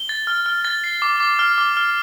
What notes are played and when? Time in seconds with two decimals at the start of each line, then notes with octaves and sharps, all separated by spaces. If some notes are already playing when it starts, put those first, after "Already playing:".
Already playing: G7
0.09 A6
0.27 F6
0.46 F6
0.65 A6
0.84 C7
1.02 D6
1.20 D6
1.39 F6
1.58 D6
1.77 F6